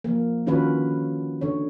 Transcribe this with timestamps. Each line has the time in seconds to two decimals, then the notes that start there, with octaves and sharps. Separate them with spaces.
0.04 F3 A#3
0.46 D3 D#3 C#4 F4 F#4 B4
1.41 D3 C#5